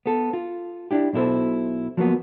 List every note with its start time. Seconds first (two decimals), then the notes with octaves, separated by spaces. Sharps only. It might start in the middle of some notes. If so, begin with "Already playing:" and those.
0.06 B3 A4
0.33 F4
0.91 D4 E4 G4
1.13 B1 B2 E4 A4 C5
1.97 F3 F#3 A#3 B3